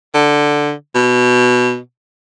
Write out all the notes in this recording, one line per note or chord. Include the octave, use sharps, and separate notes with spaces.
D3
B2